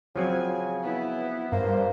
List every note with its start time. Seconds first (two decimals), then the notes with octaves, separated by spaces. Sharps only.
0.16 C#3 F3 F#3 C4 G#5
0.82 B3 E4
1.52 G2 A#3 C5